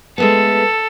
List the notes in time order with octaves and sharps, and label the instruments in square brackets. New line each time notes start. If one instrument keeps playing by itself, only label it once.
[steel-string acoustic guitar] G#3 A3 B3 [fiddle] A4